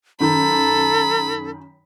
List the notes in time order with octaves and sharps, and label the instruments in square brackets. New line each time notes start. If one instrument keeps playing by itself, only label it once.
[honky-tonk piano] F#2 D#3 [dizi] A4 [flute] A#5 [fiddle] B5